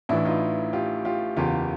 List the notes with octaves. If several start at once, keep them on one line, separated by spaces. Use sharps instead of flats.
A1 A2 E3 D4 E4
D#4 F4
F4 G4
F4 G4
F#1 E2 C#3 F4 G4